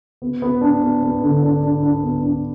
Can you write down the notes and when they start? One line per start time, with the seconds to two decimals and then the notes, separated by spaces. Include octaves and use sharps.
0.22 B3
0.42 B3
0.61 D4
0.82 B3
1.03 B3
1.22 D3
1.42 D4
1.63 D4
1.83 D4
2.03 B3
2.23 D4